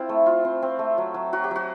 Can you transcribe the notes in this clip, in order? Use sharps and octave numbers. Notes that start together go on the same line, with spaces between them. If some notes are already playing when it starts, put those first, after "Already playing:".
Already playing: C4 E4 F4
A3
F4
C4
C4
A3
F#3
F#3
F#3 F#4
G4
F#3 F#4